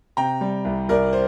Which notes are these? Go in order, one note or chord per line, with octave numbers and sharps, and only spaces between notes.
C3 G5 A#5
G3
C2
C2 A#4 D5
C5